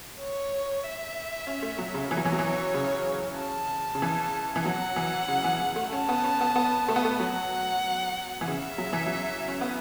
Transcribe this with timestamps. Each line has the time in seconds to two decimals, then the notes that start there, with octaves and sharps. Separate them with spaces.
0.20 C#5
0.83 E5
1.47 C#4
1.62 A3
1.78 F#3
1.94 C#3
2.11 E3 C#5
2.17 F#3
2.25 E3
2.32 F#3
2.39 E3
2.74 C#3
3.37 A5
3.95 C#3
4.02 E3
4.56 E3
4.65 F#3 F#5
4.96 E3
5.28 C#3
5.44 E3
5.60 E3
5.76 A3
5.92 C#4 A5
6.09 B3
6.24 C#4
6.41 B3
6.56 B3
6.88 A3
6.96 B3
7.05 A3
7.20 F#3 F#5
8.41 E3
8.47 C#3 E5
8.78 F#3
8.93 E3
9.06 F#3
9.48 C#4
9.61 B3